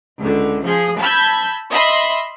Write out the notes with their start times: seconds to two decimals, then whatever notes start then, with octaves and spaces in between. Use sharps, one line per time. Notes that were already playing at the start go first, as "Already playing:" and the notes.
0.21 C#2 D3
0.65 F3 G#4
1.00 A5 B5 E6 G6 G#6
1.71 D#5 E5 B5 C6